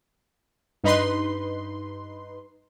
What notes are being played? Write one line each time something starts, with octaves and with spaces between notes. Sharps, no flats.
G2 D#4 B4 C6